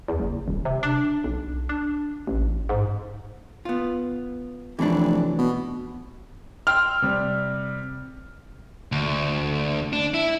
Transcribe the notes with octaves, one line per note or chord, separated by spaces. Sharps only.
E2
F#1
D#1
C3
D4
B1
D4
A1
G#2
B3 F4
F1 E3 F#3 D4
B2
G5 C6 E6 F6
C3 G3
D2
D4
E4